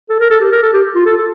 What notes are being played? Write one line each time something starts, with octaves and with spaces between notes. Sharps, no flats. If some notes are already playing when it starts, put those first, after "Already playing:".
A4
A#4
A4
G4
A#4
A4
G4
F4
A4
A4